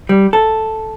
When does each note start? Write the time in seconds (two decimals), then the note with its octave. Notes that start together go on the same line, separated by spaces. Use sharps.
0.09 G3
0.33 A4